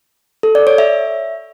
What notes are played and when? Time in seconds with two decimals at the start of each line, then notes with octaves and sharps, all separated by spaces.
0.43 A4
0.55 D5
0.67 C#5
0.78 E5